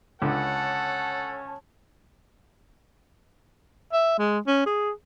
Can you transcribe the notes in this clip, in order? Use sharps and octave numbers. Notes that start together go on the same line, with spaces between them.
C#2 D3 C#4 A4 C#5 F#5 A5
E5
G#3
C#4
G#4